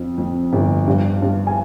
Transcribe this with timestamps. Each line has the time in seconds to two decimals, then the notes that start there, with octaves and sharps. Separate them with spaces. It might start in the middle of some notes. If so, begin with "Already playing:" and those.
Already playing: F2
0.18 F2
0.53 G1
0.87 G2
1.22 G2
1.47 G#5